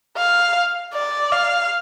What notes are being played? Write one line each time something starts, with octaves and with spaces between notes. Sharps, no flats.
F5
D5
F5